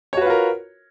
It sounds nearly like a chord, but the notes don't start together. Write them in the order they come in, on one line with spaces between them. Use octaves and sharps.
C#5 F#4 B4 F4 A#4